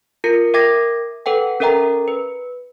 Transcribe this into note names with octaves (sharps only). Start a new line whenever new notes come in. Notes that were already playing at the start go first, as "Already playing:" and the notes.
F4 A#4 C#7
A#4 E5 G5 D6 G#6 A#6
A4 B4 F#5 G5
C#4 A4 A#4 E5 G5 A#5
B4